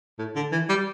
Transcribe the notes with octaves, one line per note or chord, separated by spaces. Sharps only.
A2
D3
E3
G3